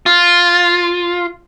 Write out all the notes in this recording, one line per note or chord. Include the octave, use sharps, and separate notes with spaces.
F4